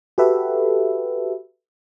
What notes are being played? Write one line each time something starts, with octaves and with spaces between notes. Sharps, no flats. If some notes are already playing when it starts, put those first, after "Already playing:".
F#4 G4 A4 B4 E5